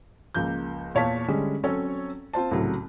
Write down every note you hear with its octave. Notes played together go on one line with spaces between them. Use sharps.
C#2 F3 A#3 G6
E2 A#2 C#5 F5 A5 B6
D3 G3 G#3 C#4
F#3 C4 C#4 A4 C#5
C4 F4 C5 A5
C2 A2 C#3 F#3